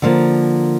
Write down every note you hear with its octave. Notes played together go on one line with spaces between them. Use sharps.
D3 F3 A#3